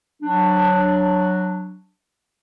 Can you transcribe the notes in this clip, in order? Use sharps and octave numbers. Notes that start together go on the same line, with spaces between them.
F#3 D4